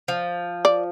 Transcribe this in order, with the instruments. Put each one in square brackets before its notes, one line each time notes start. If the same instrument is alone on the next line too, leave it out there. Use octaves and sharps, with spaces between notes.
[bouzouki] F3
[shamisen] D5